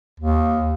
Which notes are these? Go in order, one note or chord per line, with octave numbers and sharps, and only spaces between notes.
D#2